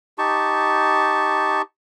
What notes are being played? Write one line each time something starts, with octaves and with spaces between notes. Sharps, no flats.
D#4 G4 A5 C#6